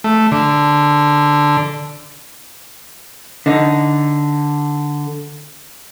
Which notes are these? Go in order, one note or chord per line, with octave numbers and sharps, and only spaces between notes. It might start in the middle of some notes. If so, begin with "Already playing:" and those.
A3
D3
D3 D#4